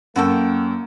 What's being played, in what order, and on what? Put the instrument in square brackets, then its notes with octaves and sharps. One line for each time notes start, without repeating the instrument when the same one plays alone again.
[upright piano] F#2 [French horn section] A#3 [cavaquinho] F#4 A4 G5